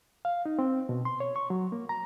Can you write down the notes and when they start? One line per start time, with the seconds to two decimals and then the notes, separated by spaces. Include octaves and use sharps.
0.25 F5
0.46 D#4
0.59 C4
0.89 B2
1.05 C6
1.20 C#5
1.36 C#6
1.50 F#3
1.72 A#3
1.89 A#5